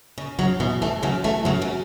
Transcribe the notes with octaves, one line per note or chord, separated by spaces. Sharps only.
C#3
C#3 F#3
B2 E3
E3 A3
C#3 F#3
E3 A3
C#3 F#3
C#3 F#3